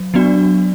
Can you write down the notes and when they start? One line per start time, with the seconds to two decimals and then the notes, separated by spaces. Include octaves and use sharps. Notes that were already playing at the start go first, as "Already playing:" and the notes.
Already playing: F#3
0.14 F#3 B3 D4 F#4 D5